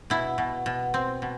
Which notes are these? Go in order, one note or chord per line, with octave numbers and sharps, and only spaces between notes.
B2 E4
B2
B2
C4
B2